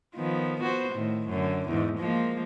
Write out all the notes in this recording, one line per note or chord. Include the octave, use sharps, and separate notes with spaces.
D#3 F3 B3
B3 F#4 C5
A2 D#3
F#2 D3
E2 G#2
F3 G#3 A#3